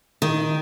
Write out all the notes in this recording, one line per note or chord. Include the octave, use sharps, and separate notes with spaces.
D#3